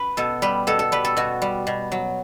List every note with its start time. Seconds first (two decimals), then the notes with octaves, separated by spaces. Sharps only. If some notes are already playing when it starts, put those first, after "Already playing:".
Already playing: B4
0.17 B2 A4
0.42 G3 B4
0.67 B2 A4
0.79 A4
0.92 G3 B4
1.05 A4
1.17 B2 F#4
1.42 G3
1.67 B2
1.92 F#3